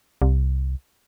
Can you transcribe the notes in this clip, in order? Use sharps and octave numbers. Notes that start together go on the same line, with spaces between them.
C2